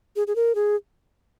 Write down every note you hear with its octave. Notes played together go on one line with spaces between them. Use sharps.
G#4
G#4
A#4
G#4